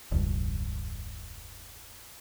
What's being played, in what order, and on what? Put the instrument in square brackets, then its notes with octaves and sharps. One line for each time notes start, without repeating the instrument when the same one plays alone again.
[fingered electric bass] E1 C#2 G2